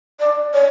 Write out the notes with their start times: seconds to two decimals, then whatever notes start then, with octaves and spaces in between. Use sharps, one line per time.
0.20 D5
0.54 C#5